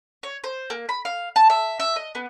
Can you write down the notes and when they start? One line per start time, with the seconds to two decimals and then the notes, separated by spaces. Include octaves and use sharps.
0.23 C#5
0.44 C5
0.70 A#3
0.89 B5
1.05 F5
1.36 A5
1.50 E5
1.80 E5
1.96 D#5
2.15 B3